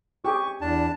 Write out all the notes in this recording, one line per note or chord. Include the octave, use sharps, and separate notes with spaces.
G4 G#4 C#6
E2 D4 A5